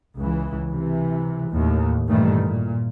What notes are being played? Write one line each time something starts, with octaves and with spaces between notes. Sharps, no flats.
C#2 E3
C3 E3
D#2 A2
G2 A#2 D#3 E3 G3 A3
A#2